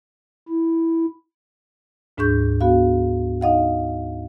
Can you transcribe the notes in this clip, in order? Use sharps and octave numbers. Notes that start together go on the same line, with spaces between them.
E4
D2 G#2 D4 G#4 C#6 G6
B3 F#4 F5
D#4 D#5 F5 F#5